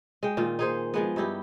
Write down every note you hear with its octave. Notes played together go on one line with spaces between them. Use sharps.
G#3 G5
A#2 D#3 F4
D#4 G#4 C5
F3 G#3 B3
G2 D#4 E4 G4